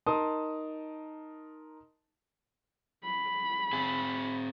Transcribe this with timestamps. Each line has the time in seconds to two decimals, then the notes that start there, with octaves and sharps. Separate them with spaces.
0.06 D#4 A#4 A5 C6 D#6
3.04 B5
3.73 C4 G#4